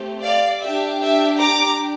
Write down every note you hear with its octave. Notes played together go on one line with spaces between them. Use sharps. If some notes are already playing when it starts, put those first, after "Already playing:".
Already playing: A3 C4 G4
D5 F5
D4 G4 E5
E5
A#5 D6